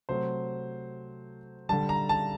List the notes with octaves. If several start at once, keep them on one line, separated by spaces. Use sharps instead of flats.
C3 F#3 A3 C5
D3 G3 A5
A#5
A5